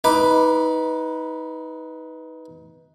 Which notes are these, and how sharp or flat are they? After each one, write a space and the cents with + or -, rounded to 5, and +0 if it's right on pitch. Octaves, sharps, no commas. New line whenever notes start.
D#4 +25 B4 +0 D6 +0